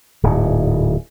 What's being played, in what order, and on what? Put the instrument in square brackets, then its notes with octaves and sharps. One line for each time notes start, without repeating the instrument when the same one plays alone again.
[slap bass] D1 G#2